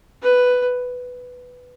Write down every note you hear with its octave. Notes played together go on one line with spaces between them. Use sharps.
B4